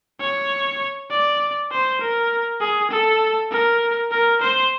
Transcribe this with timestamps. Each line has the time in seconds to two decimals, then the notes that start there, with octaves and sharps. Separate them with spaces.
0.20 C#5
1.10 D5
1.71 C5
2.01 A#4
2.61 G#4
2.91 A4
3.52 A#4
4.11 A#4
4.41 C5